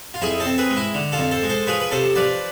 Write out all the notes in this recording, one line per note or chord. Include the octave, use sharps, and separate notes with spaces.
F4
F2 E4 G#4
A4 C5
C4
G#4 B4
G#3
E4
D3
F4 A4
F2
A4 C5
G#3
A4 C5
F3 G#4 B4
B4
C3 A4 C5
F3 B4 D5